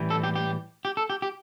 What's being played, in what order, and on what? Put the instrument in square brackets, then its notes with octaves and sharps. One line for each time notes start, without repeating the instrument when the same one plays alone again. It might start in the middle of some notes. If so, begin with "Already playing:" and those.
Already playing: [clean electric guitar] A2 E3 G3
A4
G4
G4
G4
A4
G4
G4